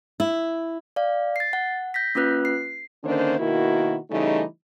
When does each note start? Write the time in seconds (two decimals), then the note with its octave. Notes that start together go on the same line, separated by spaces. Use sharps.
0.20 E4
0.96 D5 F5
1.36 A6 C7
1.53 F#5
1.94 G6 A#6 B6
2.15 A#3 C#4 F4 B4 F#6
2.45 C7
3.04 D3 D#3 A#3 C#4 D4 C5
3.39 B2 D#3 A#3 E4 F#4
4.10 C#3 E3 G3 A3 D#4